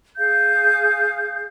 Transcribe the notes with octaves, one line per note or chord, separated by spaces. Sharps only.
G#4 F5 G6